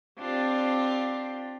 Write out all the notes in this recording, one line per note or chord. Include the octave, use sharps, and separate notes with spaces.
C4 D4 F4 G4